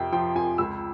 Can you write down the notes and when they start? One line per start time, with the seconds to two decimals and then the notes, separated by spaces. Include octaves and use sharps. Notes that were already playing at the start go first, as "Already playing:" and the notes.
Already playing: F2 C3 G5
0.12 F3 G5
0.35 F2 G#5
0.58 C#2 E6